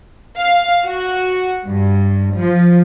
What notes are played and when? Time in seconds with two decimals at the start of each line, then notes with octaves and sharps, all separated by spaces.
0.38 F5
0.86 F#4
1.67 G2
2.36 F3